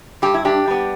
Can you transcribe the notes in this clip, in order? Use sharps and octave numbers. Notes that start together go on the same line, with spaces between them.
G2 G4
E4
D4 G4
G3 B3